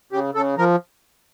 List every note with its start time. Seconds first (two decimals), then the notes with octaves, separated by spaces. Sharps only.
0.12 C#3 G4
0.35 C#3 A4
0.58 F3 A#4